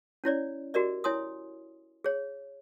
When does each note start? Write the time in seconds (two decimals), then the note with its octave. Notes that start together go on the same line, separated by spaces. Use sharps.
0.24 C#4 E4 C#5 D5
0.74 F#4 G4 A#4 D5 D#5
1.04 E4 C#5 G#5 C6 D#6
2.04 G#4 C#5